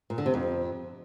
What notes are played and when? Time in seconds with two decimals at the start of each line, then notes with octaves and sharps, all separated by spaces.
0.10 A#2
0.18 D3
0.26 C3
0.34 F2